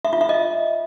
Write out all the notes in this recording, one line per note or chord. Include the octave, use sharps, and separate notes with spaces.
E5
F4
E5
D#5